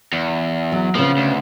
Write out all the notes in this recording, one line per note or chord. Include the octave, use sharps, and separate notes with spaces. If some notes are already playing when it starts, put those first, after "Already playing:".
E2
F#3
C#3 F3 B3
D2